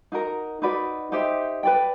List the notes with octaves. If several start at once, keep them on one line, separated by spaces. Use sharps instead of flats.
D#4 F#4 A#4
D#4 F#4 B4 D5
D#4 G4 C5 E5
B4 D5 G5